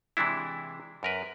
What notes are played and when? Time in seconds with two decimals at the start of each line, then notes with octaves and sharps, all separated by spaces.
0.17 C3 E3 G#3 D4 E4
1.03 F#2 A#4 B4